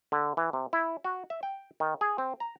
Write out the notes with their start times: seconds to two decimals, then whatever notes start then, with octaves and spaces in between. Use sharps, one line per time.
0.12 D3
0.37 E3
0.53 C3
0.73 E4
1.04 F#4
1.30 E5
1.43 G5
1.80 D#3
2.01 G#4
2.18 C4
2.40 A#5